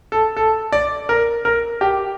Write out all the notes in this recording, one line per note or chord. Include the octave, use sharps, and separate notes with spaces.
A4
A4
D5
A#4
A#4
G4